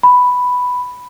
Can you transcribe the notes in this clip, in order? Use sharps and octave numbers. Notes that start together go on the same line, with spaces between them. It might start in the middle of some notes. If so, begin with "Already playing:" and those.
B5